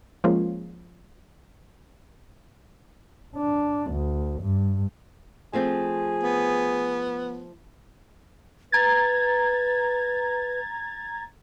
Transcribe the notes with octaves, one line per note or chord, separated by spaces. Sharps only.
F3 G#3 A#3 C#4 F4
D4
D2
G2
F3 A3 C4 G#4
B3
B4 A#5 G#6 A6